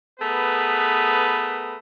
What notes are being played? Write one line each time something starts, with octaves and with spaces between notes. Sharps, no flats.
A3 B3 G#4 A#4 B4